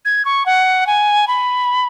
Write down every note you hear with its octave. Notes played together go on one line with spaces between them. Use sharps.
G#6
C#6
F#5
G#5
B5